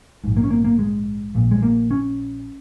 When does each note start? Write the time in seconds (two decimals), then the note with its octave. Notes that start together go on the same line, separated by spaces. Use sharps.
0.24 A#1 G#2
0.37 A#3
0.44 C#4
0.51 A#3
0.64 A#3
0.79 G#3
1.35 A#1 A#2
1.51 G#3
1.62 A#3
1.91 C#4